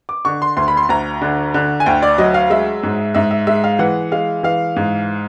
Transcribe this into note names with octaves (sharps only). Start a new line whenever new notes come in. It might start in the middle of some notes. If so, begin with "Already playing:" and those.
D6
D3 C#6
C6
D2 C6
B5
C6
D2 A#5
D3
D3
G#5
D2 G5
D5
F#3 D#5
F5
G#3 E5
G#2
G#2 E5
E5
G#3 E5
F5
E3 F#5
G#3 F5
E3 F5
G#2